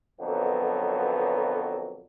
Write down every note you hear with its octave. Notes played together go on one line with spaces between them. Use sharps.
B1 F2 D3 F#3 A#3 B3